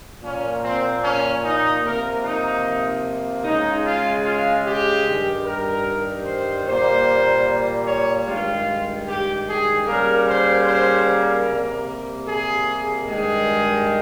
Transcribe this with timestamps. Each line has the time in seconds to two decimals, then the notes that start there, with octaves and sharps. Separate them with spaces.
0.22 A#2 F3 A#3 C#4
0.63 C4
1.04 C#4
1.43 D#4
1.83 C3 F3 A#3 A#4
2.23 D#4
3.44 C#3 G#3 D#4
3.84 F4
4.25 F4
4.64 G4
5.05 G2 D#3 G3
5.44 A#4
6.25 C5
6.65 A#2 G3 A#3 C5
7.86 C#5
8.26 G2 D#3 G#3 F4
9.06 G4
9.46 G#4
9.86 C#3 G3 A#3 A#4
10.27 C5
10.66 C5
11.07 A#4
11.47 C3 G3 A#3
12.27 G#4
13.07 G2 D#3 G#3 G#4